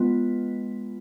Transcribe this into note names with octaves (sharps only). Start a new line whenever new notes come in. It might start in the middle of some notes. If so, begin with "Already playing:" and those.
Already playing: G#3 B3 F4 B4